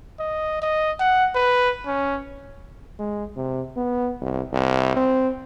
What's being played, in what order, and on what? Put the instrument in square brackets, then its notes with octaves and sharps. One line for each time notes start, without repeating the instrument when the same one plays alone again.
[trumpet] D#5
D#5
F#5
B4
C#4
[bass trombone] G#3
C3
B3
C2
C2
C4